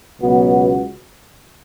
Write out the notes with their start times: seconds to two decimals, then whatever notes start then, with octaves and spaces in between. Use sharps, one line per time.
0.18 C#2 B2 F#3 B3 F#4